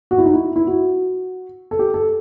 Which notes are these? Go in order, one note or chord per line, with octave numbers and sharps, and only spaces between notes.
F#4
E4
D#4
E4
E4
F#4
A4
G4
A4